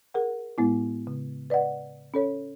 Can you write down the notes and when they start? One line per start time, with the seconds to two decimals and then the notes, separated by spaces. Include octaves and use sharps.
0.14 G#4 A#4 F#5
0.58 A2 G#3 B3 E4
1.07 C#3
1.50 B4 D5 D#5 F#5
2.14 C#4 A4 C#5